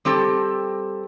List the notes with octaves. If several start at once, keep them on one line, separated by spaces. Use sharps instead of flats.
G3 C4 G4 A4